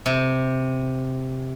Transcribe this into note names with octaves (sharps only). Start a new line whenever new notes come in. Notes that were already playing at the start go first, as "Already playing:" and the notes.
C3